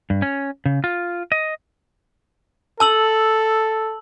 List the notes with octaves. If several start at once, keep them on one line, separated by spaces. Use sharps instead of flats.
G2
C#4
C#3
F4
D#5
A4 A5 E6 F#7